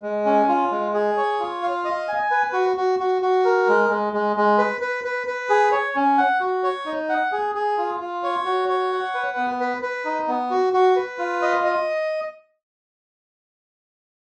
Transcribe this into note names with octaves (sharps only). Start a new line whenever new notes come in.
G#3
C#4
F4
G#3
G#4
C#5
F4
F5
D#5
G#5
B4
F#4
F#4
F#4
F#4
A#4
G#3
G#3
G#3
G#3
B4
B4
B4
B4
G#4
C#5
C#4
F#5
F#4
C#5
D#4
F#5
G#4
G#4
F4
F4
C#5
F#4
C#5
F#5
B4
B3
B4
B4
D#4
B3
F#4
F#4
B4
F4
D#5
D#5